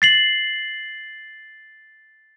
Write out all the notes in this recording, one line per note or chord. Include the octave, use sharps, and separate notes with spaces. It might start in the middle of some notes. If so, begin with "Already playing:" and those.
A6 C7 F#7